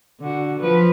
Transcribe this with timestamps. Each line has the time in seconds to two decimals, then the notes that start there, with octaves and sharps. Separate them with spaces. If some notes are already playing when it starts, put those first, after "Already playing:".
0.20 D3 F#4
0.59 F3 B4